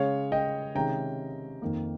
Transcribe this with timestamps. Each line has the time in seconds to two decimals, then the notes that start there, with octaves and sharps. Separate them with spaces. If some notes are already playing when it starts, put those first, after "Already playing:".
Already playing: C#3 G#3 C#4 C#5 F5
0.32 D#5 G5
0.75 C3 D#3 G#3 C#4 G5 A#5
1.62 F2 D#3 A#3